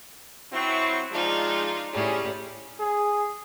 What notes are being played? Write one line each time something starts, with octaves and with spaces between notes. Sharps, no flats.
F#3 C4 E4 C#6
F3 G#3 D4 D#4 F4
A2 G3 C#4 G#4
G#4